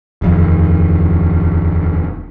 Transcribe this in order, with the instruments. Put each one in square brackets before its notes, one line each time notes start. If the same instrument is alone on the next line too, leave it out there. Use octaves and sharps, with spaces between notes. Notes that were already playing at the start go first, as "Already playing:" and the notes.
[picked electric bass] D#1 F2 D#3